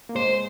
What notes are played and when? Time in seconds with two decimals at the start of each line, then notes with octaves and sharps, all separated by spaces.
0.09 A#3
0.16 G#3 C5